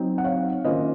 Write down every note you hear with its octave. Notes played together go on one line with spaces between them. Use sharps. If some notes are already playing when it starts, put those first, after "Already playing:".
Already playing: F#3 C4 D#4
F#5
C#5 F5
D#3 A#3 C#4 F4 C5 D#5